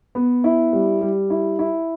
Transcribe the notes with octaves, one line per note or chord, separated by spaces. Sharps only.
B3
E4
G3
G3
E4
E4